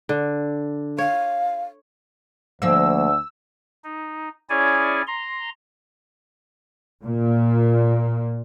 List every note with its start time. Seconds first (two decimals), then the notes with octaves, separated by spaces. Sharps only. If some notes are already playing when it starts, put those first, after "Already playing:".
0.09 D3
0.98 C#5 F5
2.62 D2 F3 A#3 F5 E6
3.84 D#4
4.50 C#4 E4 G#4 C#5 D5 G#5
5.07 A#5 C6
7.03 A#2